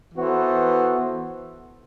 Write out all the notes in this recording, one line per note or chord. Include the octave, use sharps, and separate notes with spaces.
E3 B3 F#4 A4 C5